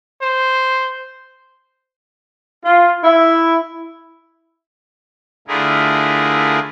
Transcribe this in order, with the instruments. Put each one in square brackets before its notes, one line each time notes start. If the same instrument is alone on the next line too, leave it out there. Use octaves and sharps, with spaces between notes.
[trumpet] C5
[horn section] F4
E4
[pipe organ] D3 A3 E4 F4 G#4 A#4